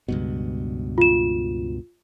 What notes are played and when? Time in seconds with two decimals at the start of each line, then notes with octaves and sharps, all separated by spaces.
0.08 C#2 G2 B2
0.98 F4 E7